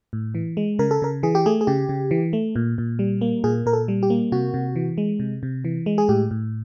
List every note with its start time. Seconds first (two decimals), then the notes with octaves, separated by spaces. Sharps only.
0.13 A2
0.35 E3
0.57 G#3
0.79 C#3 A#4
0.91 A4
1.02 C#3 A#4
1.23 E3 G#4
1.35 G4
1.46 A3 G#4
1.61 G#4
1.67 C#3 G4
1.89 C#3
2.11 E3
2.33 A3
2.56 A#2
2.78 A#2
2.99 G3
3.21 A#3
3.44 A#2 G#4
3.66 A#2 A#4
3.73 A4
3.88 G3
4.03 G4
4.10 A#3
4.32 C3 F#4
4.54 C3
4.76 E3
4.98 G#3
5.20 C3
5.43 C3
5.65 E3
5.86 G#3
5.98 G#4
6.09 A2 G4
6.31 A2